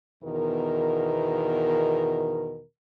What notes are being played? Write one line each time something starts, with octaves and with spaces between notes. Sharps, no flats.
E2 B2 D#3 A#4